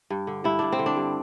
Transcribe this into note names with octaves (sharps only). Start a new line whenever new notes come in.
G2
D3
G2 E4
G2 D4
C4
D3
D4
G2